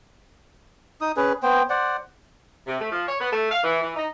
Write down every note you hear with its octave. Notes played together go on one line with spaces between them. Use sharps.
D#4 D#6
C#4 G#4 B4
B3 C5 G5
C5 D5 F#5
C3
A3
F3
C#5
B3
A3
F5
E3
E3
D#4